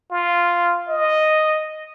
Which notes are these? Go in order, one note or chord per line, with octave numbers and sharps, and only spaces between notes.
F4
D#5